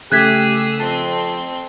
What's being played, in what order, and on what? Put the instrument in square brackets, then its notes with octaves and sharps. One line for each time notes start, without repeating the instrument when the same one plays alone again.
[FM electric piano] C#3 A3 [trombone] G4 [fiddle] G#4 E6 [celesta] F#6 G#6 B6
[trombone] F2 [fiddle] C4 [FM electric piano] A5